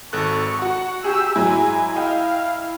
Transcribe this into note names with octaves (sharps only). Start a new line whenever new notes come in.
G#1 A4 C#6 F#6
F#4 F#5
G4 G#4 E6
G#2 F#3 G#3 E4 G#5
D#5 F5 G5